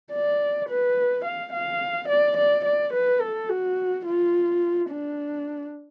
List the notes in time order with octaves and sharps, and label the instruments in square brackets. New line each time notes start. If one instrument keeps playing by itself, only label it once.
[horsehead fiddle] D5
B4
F5
F5
D5
D5
D5
B4
A4
F#4
F4
D4